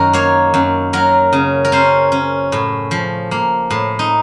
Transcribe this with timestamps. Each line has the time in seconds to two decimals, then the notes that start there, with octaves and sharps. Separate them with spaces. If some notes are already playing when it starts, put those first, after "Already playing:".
Already playing: F#2 D#3 F#4 A#4
0.13 A#3 C#5
0.54 F#2
0.93 F#3 A#4
1.33 C#3
1.65 A#4
1.72 C#4 C5
2.12 C#4
2.52 A2
2.91 F3
3.31 A#3
3.71 A2
3.99 D#4